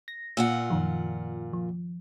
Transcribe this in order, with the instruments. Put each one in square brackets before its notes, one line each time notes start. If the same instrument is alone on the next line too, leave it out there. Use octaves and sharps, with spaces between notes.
[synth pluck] A#6
[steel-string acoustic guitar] A#2 F4 F#5 [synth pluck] E6
[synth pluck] F#2 D#3 F3
F3